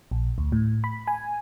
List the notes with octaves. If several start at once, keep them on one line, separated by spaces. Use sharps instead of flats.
A#1
D2
A2
B5
G#5